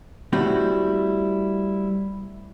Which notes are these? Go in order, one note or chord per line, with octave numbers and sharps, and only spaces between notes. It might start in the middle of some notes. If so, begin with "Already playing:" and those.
G3 A3 C4 E4 F#4